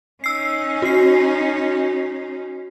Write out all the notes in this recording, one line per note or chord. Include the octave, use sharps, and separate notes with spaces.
C#4 D#4 E6 C7
F#4 C7